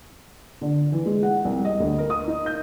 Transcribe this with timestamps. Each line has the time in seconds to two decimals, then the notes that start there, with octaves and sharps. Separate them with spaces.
0.61 D3
0.92 E3
1.06 G#3
1.23 F#5
1.45 C2
1.64 D#5
1.80 D2
1.98 A#4
2.10 D#6
2.27 D#4
2.46 G6